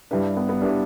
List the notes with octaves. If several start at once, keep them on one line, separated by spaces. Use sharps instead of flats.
G2 G3 D4 E4 B4
B3
B3
G3 D4 E4 B4